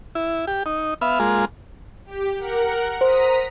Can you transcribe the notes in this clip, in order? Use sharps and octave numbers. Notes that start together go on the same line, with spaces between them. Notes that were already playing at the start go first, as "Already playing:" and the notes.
E4
G4
D#4
B3 E5 F5
G#3 A#3 F4
G4
A#4 F#5
C5 A#5 D#6 B6